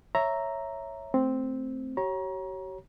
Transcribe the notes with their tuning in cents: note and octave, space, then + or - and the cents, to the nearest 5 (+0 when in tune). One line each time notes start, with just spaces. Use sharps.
C#5 -5 E5 +0 A#5 +0
A3 +0 C4 +0
G4 -45 C#5 -10 A#5 +30